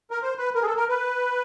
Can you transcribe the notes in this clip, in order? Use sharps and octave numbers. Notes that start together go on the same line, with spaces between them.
A#4
C5
B4
A#4
G#4
A4
A#4
B4